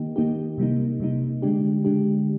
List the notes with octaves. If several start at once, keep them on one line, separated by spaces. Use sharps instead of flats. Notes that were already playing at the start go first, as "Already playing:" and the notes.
Already playing: D#3 A#3 D#4 G4
D#3 A#3 D#4 G4
C3 G3 A#3 D#4
C3 G3 A#3 D#4
D3 G#3 D4 G4
D3 G#3 D4 G4